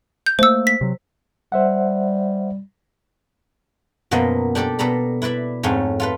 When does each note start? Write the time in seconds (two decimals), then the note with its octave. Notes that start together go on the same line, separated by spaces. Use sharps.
0.26 G6
0.39 A3 A#3 C5 E6
0.67 B6
0.81 C3 F#3
1.52 G3 C5 E5 F#5
4.11 F#2 B2 F3 A#3 D#5 F#5
4.55 D4 G4 A4 D5
4.79 B2 A4 D5 A#5 B5
5.22 E4 B4 D5 E5 B5
5.63 F2 G#2 A3 C#4
6.00 F4 A4 B4